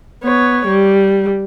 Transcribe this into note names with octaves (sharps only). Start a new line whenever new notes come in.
B3 C#5
G3